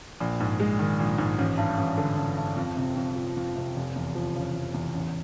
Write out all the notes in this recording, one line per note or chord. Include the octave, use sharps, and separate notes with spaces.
A#1
G#2
G#3
D#3
A#1
G#2
A1
G2
A1
D3
A1
G2
F2
C3
F2
F3
F2
C3
F1
E2
F3
C#3
F1
E2
A1